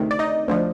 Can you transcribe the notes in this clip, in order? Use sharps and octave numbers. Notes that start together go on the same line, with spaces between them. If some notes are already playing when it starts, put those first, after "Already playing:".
Already playing: D2 C3 D#3
D5
D#4 D#5
D2 D3 F3